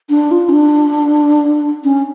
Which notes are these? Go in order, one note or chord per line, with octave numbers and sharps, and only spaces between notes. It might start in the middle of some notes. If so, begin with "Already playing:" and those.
D4
F4
C#4
D4
C#4